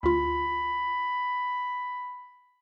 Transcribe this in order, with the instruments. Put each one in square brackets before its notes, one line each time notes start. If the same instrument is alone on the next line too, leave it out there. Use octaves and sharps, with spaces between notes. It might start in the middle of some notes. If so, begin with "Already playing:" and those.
[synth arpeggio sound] D2 F4 [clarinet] B5